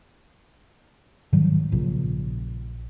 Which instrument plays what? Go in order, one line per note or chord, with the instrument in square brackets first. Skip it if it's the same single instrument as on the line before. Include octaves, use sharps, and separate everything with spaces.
[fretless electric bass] G#2 D#3 F#3 G3
A#1 A#2 C#3